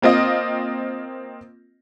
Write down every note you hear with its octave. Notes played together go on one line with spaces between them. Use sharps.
A#3 C4 F4 D#5